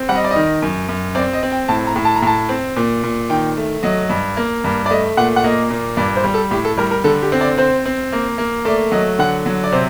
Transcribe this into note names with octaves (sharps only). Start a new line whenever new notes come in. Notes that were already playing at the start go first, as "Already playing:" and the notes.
Already playing: C4
G3 F#5
D#5
D5
D#3 D#5
F#2
F#2
C4 D5
D#5
C4
G5
A2 A5
A#5
A2
A5
A#5
A2 A5
C4
A#2
A#2
D#3 G5
A3
F#3 D#5
G2
A#3
G2
D5
A3 D#5
A#2 F#5
F#5
A#3 D#5
A#2
G2 D5
C5
G3
A4
A2 G4
A4
G3 A#4
A#4
D3 A4
G4
C4
D5
C4 C5
C4
A#3
A#3
A3 D5
F#3 D#5
D3 F#5
F#3
D5
C3 C5